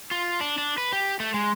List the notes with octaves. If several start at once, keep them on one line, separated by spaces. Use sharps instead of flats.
F4
D4
D4
B4
G4
A3
G#3